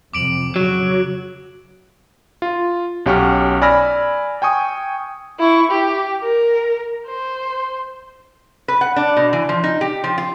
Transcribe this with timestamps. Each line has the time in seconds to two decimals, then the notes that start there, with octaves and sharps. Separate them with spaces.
0.14 F2 C3 D6 D7 F#7
0.56 C#3 F#3 F#6
2.42 F4
3.06 B1 C#4 G4 F#5 C#6 F6
3.62 D5 G#5 B5 E6 F6 A#6
4.42 G5 G#5 C#6 D#6
5.39 E4 C#6
5.71 G4
6.23 A#4
7.07 C5
8.68 B4
8.81 F#5
8.96 D4
9.17 B2
9.33 E3
9.49 F3
9.64 D#4
9.81 G4
10.04 F3
10.18 F4